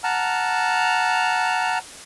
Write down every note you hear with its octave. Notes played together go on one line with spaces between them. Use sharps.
F#5 A5 A#5 F6